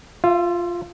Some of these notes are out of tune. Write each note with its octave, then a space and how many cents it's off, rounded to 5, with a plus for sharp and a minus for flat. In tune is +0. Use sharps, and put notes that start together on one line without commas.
F4 +0 E5 +35